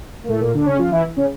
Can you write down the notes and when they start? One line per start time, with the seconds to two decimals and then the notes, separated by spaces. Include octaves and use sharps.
0.24 A#3
0.28 A2 A3
0.40 A#2 A#3
0.54 D3 D4
0.66 C#3 C#4
0.79 F3 F4
0.92 E3 E4
1.16 C#3 C#4